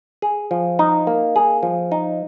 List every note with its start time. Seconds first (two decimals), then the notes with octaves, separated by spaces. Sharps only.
0.22 G#4
0.51 F3
0.79 D#4
1.07 A#3
1.36 G#4
1.63 F3
1.92 D#4